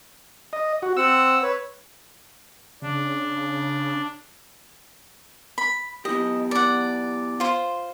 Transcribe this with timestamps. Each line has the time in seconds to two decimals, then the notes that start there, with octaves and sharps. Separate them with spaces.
0.53 D#5
0.82 F#4
0.97 C4 F#5 E6
1.42 B4 C#5
2.82 C#3 D4
5.58 B5
6.05 B3 E4 G4 D#5
6.51 D5 F#5
7.40 F4 C5